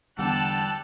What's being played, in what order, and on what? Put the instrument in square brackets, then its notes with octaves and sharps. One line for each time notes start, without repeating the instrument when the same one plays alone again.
[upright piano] E2 D3 [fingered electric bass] G3 [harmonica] G4 A4 [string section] A5 F#6